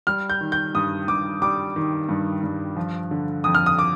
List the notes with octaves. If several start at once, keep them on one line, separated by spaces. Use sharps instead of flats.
G3 F6
G6
D#3
G6
G2 D#6
G2 D6
G3 D6
D#3
G2
G2
F3
D3
F2 D#6
F6
D#6
D6